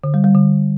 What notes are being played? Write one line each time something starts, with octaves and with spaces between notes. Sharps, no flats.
D3
G3
G3
D3